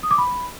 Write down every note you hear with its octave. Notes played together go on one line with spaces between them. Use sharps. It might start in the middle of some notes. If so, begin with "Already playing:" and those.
D#6
D6
B5